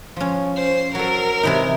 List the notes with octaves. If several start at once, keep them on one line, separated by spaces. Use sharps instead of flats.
F3 C#4
C5
F#3 A4 A#4
C3 E3 D#4